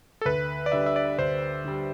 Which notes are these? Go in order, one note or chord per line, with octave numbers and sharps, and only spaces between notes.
A4
D2 B4
D5
D3 G3 E5
E5
D5
D2 C5
D3 G3